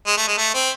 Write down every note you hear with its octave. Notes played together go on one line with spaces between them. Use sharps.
G#3
A3
G#3
A3
C4